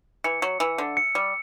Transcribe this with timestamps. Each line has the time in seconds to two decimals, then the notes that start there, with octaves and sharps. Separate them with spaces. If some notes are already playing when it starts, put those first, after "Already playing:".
0.24 E3 C#7
0.42 F#3
0.60 E3 E6
0.78 D3
0.97 C#7
1.15 G3